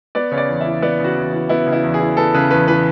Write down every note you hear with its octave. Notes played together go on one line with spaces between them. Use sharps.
B3 D5
C#3 C#5
D5
E2
E3 E5
B3 D5
C#3 F#4
E2
E3
B3 E4
C#3
E4
E2
G#4
E3
B3 A4
C#3 B4
E2 B4
E3 B4